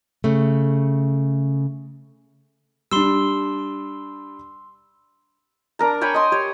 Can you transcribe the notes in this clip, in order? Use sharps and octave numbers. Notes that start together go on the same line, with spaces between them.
C#3 A3
G3 D4 C6 E6
D4 A#4 A#5
C#5 G5 G#5 B5
D#5 C6
G4 C#5